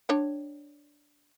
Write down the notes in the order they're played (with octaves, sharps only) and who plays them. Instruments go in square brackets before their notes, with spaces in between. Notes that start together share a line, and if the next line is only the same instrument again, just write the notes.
[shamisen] D4 C#5 G5